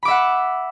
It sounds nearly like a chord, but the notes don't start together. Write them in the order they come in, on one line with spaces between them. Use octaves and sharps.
B5 D6 E5 F#5